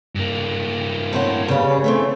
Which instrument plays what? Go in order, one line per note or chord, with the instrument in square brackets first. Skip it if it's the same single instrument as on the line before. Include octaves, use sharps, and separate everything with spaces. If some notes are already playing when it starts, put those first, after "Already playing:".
[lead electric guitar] G2 A#3
[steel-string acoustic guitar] A2 C4 F#5 [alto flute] C#5
[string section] C#3 [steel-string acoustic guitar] G3 B4
[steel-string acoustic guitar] C#3 E3 C4 [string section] A3